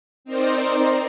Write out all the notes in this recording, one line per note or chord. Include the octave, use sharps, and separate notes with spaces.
C4 D#4 A#4 C5 D5